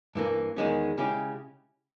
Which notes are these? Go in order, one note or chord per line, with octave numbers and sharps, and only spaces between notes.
G2 E3 A#3
E2 D#3 G#3 C#4
C#3 G#3 C#4 E4 G4